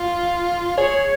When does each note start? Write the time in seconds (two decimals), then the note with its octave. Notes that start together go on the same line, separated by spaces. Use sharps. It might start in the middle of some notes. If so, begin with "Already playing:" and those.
Already playing: F4
0.77 G#4 C#5